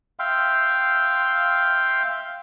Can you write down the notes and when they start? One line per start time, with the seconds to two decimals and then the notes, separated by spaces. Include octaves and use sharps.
0.19 E5 F5 G5 C6